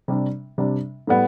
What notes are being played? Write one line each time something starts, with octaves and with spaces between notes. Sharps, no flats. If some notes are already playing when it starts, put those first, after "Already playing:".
C3 G3 D4
C3 G3 D4
A2 G3 B3